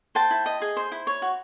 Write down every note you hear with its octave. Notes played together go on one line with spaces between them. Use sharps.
C5 G5 A5
E4
D#5
G#4
C5
E4
C#5
F#4